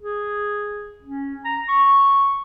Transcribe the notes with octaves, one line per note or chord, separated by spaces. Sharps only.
G#4
C#4
A#5
C#6